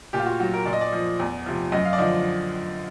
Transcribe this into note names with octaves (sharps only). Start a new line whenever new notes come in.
A#2 G4
F4
F#4
F#3 F#4
A#4
A#2 D5
D#5
D5
F3
E2
C3 F3
F#2 D#5
F5
D5
D3 F3 D#5